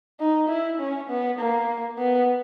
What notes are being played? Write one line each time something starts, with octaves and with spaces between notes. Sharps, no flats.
D#4
E4
C#4
B3
A#3
B3